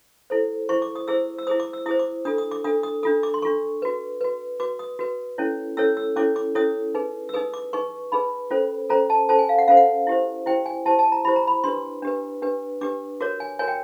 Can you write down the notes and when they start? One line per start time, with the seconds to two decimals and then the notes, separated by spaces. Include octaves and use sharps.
0.30 E4 A4 C5
0.69 E4 G#4 C5 C#6
0.82 D6
0.96 D#6
1.08 E4 G#4 C5 E6
1.38 E6
1.47 E4 G#4 C5 D#6
1.60 D6
1.73 E6
1.86 E4 G#4 C5 D#6
1.99 D6
2.25 D4 F4 A4 D#6
2.38 D#6
2.51 D6
2.64 D4 F4 A4 D#6
2.83 D#6
3.03 D4 F4 A4 D#6
3.23 D6
3.34 C6
3.42 D4 F4 A4 C#6
3.82 F#4 B4
4.21 F#4 B4
4.60 F#4 B4 D6
4.79 D#6
4.99 F#4 B4
5.38 C#4 E4 A4 C#5
5.77 C#4 E4 A4 C#5 E6
5.97 E6
6.16 C#4 E4 A4 C#5 D6
6.36 D6
6.55 C#4 E4 A4 C#5 D#6
6.94 D#4 G#4 B4
7.29 E6
7.33 D#4 G#4 B4 D#6
7.54 D6
7.73 D#4 G#4 B4 C#6
8.12 D#4 G#4 B4 B5
8.51 C#4 F4 A4 C5
8.90 C#4 F4 A4 C5 A#5
9.10 A5
9.29 C#4 F4 A4 C5 A5
9.39 G#5
9.49 F5
9.58 F#5
9.68 C#4 F4 A4 C5 F5
9.77 F#5
10.07 E4 G4 C5
10.46 E4 G4 C5 G5
10.66 G#5
10.85 E4 G4 C5 A5
10.99 A5
11.12 A#5
11.25 E4 G4 C5 B5
11.36 A#5
11.47 B5
11.64 D4 G4 B4 C6
12.02 D4 G4 B4
12.42 D4 G4 B4
12.81 D4 G4 B4 D6
13.20 F#4 A#4 C#5 D6
13.40 G#5
13.59 F#4 A#4 C#5 G#5
13.68 G5